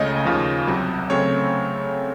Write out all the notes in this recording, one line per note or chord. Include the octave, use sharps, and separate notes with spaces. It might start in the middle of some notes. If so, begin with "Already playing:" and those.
Already playing: C#2 C#3 A3 C#4 D#5
D#2 C#3 F3
C2 C3 F#3
C#3 F#3 A3 C4 C#5